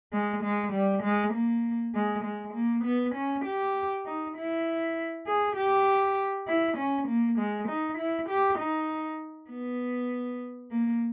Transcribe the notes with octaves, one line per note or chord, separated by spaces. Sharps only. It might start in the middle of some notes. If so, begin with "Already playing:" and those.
G#3
G#3
G3
G#3
A#3
G#3
G#3
A#3
B3
C#4
G4
D#4
E4
G#4
G4
E4
C#4
A#3
G#3
D#4
E4
G4
D#4
B3
A#3